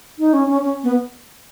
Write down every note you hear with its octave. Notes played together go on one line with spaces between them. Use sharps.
D#4
C#4
C#4
C#4
B3